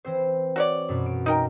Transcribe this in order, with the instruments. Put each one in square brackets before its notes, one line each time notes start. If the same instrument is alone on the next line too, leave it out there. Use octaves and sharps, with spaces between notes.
[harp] E3 C4 C5
[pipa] F#4 C#5 D5
[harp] F#2 B2
D7
[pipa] D#4 A#4 G5